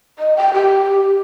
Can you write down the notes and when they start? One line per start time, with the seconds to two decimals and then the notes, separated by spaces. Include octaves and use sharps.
0.19 D#5
0.37 G5
0.54 G4